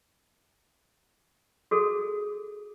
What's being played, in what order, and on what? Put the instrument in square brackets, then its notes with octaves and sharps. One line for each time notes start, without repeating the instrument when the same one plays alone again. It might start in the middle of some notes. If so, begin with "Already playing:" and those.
[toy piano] F#4 G#4 A4